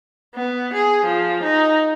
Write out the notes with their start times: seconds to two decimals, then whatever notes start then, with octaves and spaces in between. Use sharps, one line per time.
0.35 B3
0.73 G#4
1.05 F3
1.43 D#4